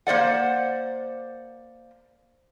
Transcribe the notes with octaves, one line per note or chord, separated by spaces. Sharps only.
A#3 C5 D5 F#5